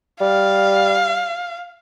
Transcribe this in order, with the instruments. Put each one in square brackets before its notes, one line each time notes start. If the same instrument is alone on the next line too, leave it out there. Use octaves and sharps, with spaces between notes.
[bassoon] G3 [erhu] F5